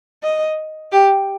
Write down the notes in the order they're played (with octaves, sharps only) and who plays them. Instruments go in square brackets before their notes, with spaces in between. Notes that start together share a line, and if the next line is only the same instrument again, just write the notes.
[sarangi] D#5
G4